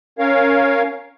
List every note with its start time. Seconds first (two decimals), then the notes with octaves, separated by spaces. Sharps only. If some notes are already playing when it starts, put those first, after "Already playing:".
0.19 C#4 A#4 C#5 F5